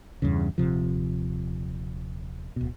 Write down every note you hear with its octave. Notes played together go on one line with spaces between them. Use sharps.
E2 G2 C#3
D#1 C3 F3
D1 B2